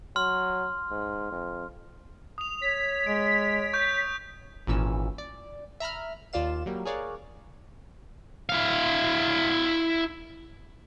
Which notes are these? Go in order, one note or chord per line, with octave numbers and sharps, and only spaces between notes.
F#3 C6 F6
G#2
F2
D#6 F7
C#5 B6
G#3 D7
C#6 G6 D7
G#1 A#2 E3 C#4 E6
D5
E5 A#5 B5 F6
D#2 F4 D5 F5 E7
F#3 G3 A#3
G#4 A#4 C#5 D5 F5 F#5
E4 F5